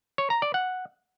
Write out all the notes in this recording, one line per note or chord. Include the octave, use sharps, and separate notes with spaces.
C#5
A#5
D5
F#5